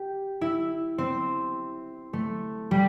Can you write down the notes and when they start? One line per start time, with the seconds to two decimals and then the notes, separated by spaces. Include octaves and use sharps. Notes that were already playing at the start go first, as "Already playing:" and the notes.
Already playing: G4
0.41 E4
0.98 C4
2.13 A3
2.71 G3